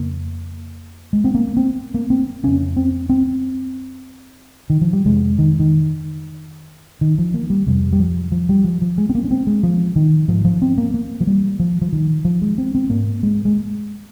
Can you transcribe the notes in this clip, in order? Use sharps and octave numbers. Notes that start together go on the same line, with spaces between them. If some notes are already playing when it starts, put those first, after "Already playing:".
Already playing: F2 C#3 A#3
G#3
C4
A#3
C4
A#3
C4
F2 C#3 C#4
C4
C4
D#3
F3
G3
F2 C3 G#3
D#3
D#3
D#3
F3
A#3
G3
F2 C3 G3
G3
F3
F3
G3
F3
F3
G#3
C4
A#3
C#4
C4
G#3
F3
D#3
G#2 F3
F3
C4
A#3
A#3
F3
G3
F3
F3
D#3
F3
G#3
C4
C4
G#2 A#3
G#3
G#3